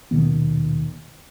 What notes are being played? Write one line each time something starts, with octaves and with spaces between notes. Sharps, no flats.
D#1 B2 D#3 B3